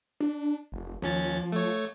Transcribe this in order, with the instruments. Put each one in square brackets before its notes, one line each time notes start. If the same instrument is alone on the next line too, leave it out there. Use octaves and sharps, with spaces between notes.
[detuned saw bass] D4
F1
[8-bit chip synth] D#2 C#4 A6 [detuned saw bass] F3
[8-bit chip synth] A3 C#5